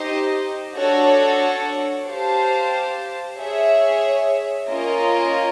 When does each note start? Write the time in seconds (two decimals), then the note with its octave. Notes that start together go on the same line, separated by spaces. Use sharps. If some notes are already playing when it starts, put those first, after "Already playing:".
Already playing: D#4 G4 C5 D#5
0.77 D4 F#4 A4 C#5
2.08 G4 C5 F5 A5
3.38 G#4 C#5 E5
4.69 A#3 C#4 F4 A#4 D#5